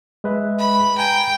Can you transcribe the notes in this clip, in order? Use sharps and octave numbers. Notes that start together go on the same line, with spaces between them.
G#3 B4 E5
B5
G5 G#5 A#5